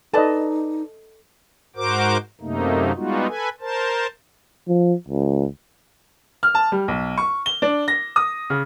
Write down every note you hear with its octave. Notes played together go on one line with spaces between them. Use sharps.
D#4 A4 B4 D5 D#5 A5
G#2 F#4 A#4 C5 D6
F#2 C3 A3 A#3 D#4
G3 G#3 B3 D#4 F4 F#4
A4 B4 G#5
A#4 C5 A5
F3
C#2
F6
A5
G3
B1
C#6
G7
D4
A#6
D#6
C#3